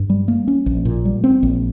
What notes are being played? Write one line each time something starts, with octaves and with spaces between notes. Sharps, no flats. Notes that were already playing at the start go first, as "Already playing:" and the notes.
Already playing: G2
G3
A#3
C#4
A#1
A#2
G3
C4
A#1